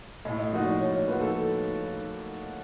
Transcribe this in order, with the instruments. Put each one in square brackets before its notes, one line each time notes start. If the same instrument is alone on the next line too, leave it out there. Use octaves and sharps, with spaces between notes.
[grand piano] A2 [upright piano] D#5
[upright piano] D#5
[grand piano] F3 A#3 D#4 F#4 [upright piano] D#5
[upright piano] D5
[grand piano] A2 [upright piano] C#5
[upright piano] C#5
[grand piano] F3 A#3 D#4 F#4 [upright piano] B4
[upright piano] A4